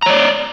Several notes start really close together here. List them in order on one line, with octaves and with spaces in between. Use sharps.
A#5 C#5 D5